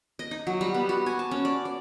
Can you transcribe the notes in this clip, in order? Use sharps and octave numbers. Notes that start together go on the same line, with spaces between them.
D#5
D#4
F#3
G3
B3
F#4
G#5
A5
C#4
D5
D5